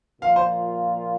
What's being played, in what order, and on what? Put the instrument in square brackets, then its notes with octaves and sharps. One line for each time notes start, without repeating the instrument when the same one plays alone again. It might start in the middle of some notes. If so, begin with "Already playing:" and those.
[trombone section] A#2 F3 A#3 F4 [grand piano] F5
[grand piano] C5